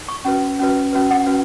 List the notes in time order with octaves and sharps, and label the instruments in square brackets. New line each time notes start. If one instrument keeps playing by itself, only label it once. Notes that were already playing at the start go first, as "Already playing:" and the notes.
Already playing: [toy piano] D#4
C#6
C#4 F#4 B4
C#4 F#4 B4
C#4 F#4 B4
F#5
C#4 F#4 B4